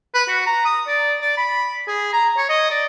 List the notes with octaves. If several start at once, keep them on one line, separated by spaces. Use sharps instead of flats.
B4
F#4
A#5
D#6
D5
D5
B5
G#4
A#5
C#5
D#5
D5